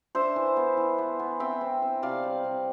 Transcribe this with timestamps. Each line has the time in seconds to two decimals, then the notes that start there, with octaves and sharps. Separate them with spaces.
0.15 D4 C5 E5
0.36 E3
0.57 B3
0.77 E3
0.98 B3
1.19 B3
1.40 C4 E5 G5
1.61 C4
1.82 C4
2.02 C3 D5 F5
2.24 G3
2.45 C3